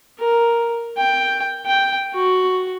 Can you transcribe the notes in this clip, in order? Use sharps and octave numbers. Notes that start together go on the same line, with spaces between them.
A#4
G5
G5
F#4